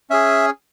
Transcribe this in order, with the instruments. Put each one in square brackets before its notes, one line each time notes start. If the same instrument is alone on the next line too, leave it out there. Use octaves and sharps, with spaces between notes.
[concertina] C#4 G#4 E5